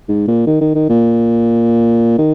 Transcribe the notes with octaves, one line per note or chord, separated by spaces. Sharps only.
G#2
A#2
D#3
D#3
D#3
A#2
D#3